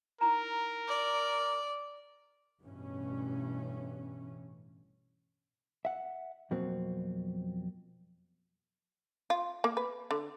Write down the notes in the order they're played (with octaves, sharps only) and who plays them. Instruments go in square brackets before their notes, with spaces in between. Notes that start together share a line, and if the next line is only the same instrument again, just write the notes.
[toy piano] D#4 E4 A#5 [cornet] A#4
[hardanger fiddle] D5
[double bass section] A1 G2 B2 E3 C#4
[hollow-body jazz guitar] E5 F#5
F2 B2 F#3 A#3 C4
[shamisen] F4
A#3
B4
D3